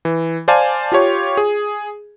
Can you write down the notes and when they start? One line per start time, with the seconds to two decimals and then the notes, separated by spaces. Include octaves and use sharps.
0.05 E3
0.48 C5 D5 F5 G#5 A5
0.92 F4 G4 C#5
1.37 G#4